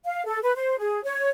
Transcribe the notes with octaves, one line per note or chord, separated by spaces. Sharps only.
F5
A4
B4
C5
G#4
C#5